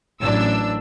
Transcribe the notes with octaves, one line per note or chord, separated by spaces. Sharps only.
A1 F#2 D4 E6